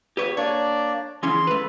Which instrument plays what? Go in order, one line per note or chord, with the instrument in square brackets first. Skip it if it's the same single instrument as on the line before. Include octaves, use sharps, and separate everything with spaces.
[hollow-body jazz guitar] G4 B4 C#5
[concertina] A#3 D4 D5 [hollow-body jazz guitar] C#5
[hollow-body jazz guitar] C#3 E3 C#4 [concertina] C6
[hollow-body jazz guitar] A3 B4